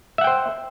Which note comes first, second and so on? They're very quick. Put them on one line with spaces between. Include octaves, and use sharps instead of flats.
E5 F#5 G5 C5